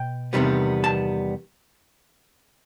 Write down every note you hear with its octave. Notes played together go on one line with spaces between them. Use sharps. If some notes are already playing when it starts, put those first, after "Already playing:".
Already playing: B2 G5
E2 C3 D#3 G3 B3
A5